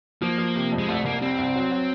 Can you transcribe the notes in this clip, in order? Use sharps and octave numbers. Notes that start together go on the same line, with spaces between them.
F3 A#3
F3
C3
F2
G#3
C2 A3
C2 A#3
G3 C4
C2
F#3
F#3